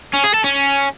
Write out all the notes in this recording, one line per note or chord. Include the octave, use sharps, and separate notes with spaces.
C#4
G#4
A4
C#4